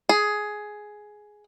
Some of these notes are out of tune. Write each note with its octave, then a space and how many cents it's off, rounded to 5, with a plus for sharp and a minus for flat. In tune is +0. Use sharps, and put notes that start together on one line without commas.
G#4 +10